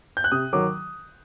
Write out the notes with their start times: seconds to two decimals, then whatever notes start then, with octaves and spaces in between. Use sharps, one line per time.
0.17 G6
0.24 F#6
0.32 C3 D#6
0.53 D#3 F#3 D6